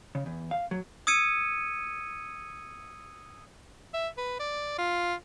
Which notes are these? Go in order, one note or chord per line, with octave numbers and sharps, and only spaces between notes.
C#3
E2
F5
F#3
D#6 E6 G#6 C#7 D#7
E5
B4
D5
F4